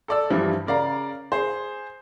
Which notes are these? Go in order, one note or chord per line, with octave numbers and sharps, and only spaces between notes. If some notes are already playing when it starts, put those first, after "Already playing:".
A4 D5 E6
G2 E3 F3 G3
C#3 A#4 D5 F5 A#5
G#4 C5